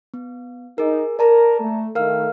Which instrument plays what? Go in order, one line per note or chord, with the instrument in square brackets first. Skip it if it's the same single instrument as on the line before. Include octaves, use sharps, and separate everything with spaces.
[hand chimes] B3
[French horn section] D#4 [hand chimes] G#4 A#4
[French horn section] A#4 [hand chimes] D5 A5 A#5
[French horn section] A3
[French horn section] D#3 A3 [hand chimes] A#4 F5 F6